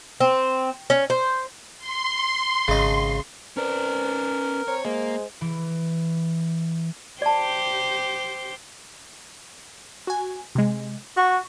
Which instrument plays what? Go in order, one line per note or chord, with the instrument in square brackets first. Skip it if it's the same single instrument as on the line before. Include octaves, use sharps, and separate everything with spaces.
[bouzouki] C4
C#4
C5
[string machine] C6
[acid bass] G#1 [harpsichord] C#3 D#5
[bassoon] C4 [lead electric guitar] C#4 D5 [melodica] A#4 [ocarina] B4
[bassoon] C4 [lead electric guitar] C#5 [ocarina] A#5
[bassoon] G#3 [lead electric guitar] A#3 [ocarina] C5
[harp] E3
[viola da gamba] G4 C5 [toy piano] D5 A5
[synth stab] F#4 G#5
C3 G#3
[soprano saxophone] F#4 [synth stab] C#6